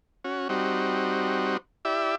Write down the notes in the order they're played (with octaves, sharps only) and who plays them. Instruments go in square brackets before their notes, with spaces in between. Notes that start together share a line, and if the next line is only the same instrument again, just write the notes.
[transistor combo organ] C#4 F#4
G3 C4 D#4 F#4
E4 G4 D5 E5